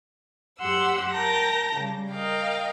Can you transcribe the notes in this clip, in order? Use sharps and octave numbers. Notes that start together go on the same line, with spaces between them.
F#2 G4 F#5 C6 E6
A#4 G5 A5 A#5 G6 A#6
C#3 G3
A#4 D#5 F5 G5